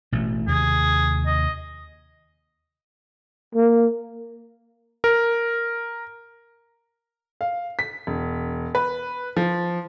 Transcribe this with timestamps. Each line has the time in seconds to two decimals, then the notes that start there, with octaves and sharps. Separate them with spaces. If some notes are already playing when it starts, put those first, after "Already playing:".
0.12 A1 B2 A3
0.48 D#2 C3 G#4
1.26 D#5
3.55 A#3
5.04 A#4
7.41 F5
7.79 B6
8.07 E1
8.75 B4
9.37 F3